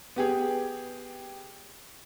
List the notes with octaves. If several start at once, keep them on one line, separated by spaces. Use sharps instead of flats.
B3 G4 G#4